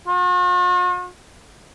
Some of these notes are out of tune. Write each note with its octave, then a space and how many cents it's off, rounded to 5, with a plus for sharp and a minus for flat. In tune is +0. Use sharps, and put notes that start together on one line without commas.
F#4 -45